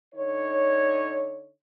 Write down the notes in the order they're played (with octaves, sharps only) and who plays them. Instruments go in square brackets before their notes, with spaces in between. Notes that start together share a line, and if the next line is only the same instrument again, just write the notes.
[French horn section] D3 D#4 C#5